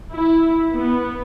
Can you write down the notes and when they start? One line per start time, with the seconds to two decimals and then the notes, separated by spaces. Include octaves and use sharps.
0.12 E4
0.75 B3